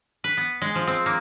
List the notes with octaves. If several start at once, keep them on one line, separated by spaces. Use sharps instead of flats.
B4
B3
G#3
F3
C4
A#3